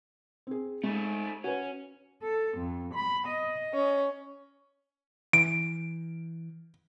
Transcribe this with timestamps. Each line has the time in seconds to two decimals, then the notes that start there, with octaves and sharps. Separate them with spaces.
0.47 C4 G#4
0.84 G#3 A3 D#4
1.44 C#4 F#4 B4
2.23 A4
2.58 F2
2.94 B5
3.27 D#5
3.74 C#4
5.33 E3 D7